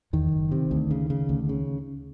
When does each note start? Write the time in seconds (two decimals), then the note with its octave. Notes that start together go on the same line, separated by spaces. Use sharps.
0.13 E2 D#3
0.32 F#1
0.52 C3
0.71 D2
0.91 C#3
1.10 C#3
1.29 D2
1.49 C#3